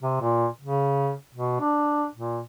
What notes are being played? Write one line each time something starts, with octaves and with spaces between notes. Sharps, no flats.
C3
A#2
C#3
B2
D4
A#2